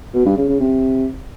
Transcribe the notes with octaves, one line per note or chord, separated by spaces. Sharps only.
B2
G2
C#3
C#3
C3